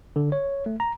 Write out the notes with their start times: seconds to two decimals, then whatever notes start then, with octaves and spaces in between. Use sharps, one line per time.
0.16 D3
0.32 C#5
0.66 A3
0.80 A#5